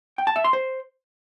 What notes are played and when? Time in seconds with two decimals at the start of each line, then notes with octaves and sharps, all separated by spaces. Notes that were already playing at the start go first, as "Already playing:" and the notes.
0.18 G5
0.27 A5
0.36 E5
0.44 C6
0.53 C5